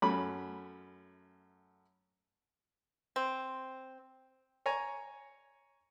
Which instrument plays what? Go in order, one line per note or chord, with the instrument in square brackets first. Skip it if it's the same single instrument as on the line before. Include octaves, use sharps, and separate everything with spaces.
[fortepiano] F#2 A3 C#4 B5
[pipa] C4
[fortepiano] C#5 G#5 A#5